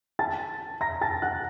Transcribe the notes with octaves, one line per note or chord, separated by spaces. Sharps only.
A5 A6
A#5 A#6
A5 A6
F#5 F#6